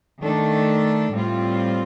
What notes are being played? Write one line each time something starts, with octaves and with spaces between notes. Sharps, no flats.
D#3 A3 D4 A4
A2 G3 C4 F4